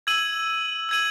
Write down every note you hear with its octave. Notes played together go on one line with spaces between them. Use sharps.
E6 G#6 D#7 F#7
E6 G#6 D#7 F#7